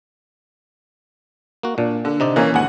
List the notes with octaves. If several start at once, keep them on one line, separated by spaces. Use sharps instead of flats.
A#3 F#4
A#2 D4
D3
C3 D#4 D5
E3 A#3 C#4
D#2 G#2 F#5 G#5